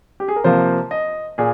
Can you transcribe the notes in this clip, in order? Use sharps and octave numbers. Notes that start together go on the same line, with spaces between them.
G4
G#4
A#4
C3 F3 A#3 C5
D#5
A#2 G#4